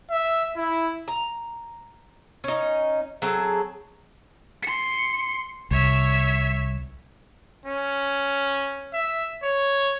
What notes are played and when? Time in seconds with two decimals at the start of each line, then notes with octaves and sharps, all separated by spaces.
0.11 E5
0.57 E4
1.08 A#5
2.44 C#4 D#4
3.22 F#3 C4 G#4 A4
4.63 C6 C#7
5.71 C2 C#5 E5
7.66 C#4
8.94 E5
9.44 C#5